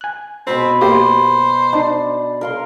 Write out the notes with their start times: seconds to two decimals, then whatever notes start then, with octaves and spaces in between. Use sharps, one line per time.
0.01 G#5 F#6
0.47 B2 C4 B4 B5
0.82 A#3 G4 C5
1.73 D4 D#4
2.41 A#4 F5 C6